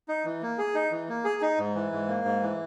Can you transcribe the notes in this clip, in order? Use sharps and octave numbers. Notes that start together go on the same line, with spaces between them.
D#4
E3
A#3
G#4
D#4
E3
A#3
G#4
D#4
G#2
E3
G#2
A#3
G#2
E3